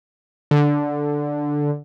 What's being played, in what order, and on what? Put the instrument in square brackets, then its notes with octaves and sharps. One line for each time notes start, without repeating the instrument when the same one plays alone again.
[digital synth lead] D3